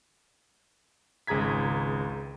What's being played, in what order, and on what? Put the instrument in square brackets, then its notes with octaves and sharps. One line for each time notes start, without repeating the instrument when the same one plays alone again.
[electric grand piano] G#1 C#2 G#4 A#5 G#6 B6